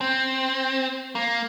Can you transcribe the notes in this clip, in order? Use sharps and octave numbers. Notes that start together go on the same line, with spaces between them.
C4
A#3